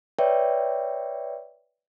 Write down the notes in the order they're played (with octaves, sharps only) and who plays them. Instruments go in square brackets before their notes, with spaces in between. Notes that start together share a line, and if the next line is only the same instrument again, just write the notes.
[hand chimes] B4 C#5 D5 E5 G5